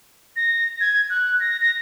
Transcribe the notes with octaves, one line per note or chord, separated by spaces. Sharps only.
A#6
G#6
F#6
A#6
A#6